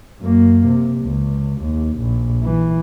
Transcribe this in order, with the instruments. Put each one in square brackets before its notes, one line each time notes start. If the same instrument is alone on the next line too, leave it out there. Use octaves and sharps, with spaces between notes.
[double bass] F#2 A#3
C3
C#2
D#2
A#1
E3